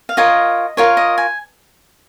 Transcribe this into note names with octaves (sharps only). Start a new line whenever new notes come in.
F5
F4 A#4 C#5 D#5
F4 A#4 C#5
D#5
G#5